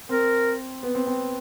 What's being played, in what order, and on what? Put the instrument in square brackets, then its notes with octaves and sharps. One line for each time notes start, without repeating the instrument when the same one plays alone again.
[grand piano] C4 [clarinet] A#4
[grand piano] B3
C4
C4